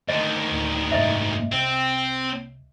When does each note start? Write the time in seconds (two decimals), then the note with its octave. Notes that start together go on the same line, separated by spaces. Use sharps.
0.09 D2 D#3 D#5
0.52 D1
0.91 F#1 C2 G#2 D#5 E5
1.51 C2 C4